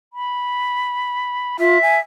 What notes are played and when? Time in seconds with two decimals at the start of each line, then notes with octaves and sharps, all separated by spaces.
0.13 B5
1.59 F4 E5
1.82 G#5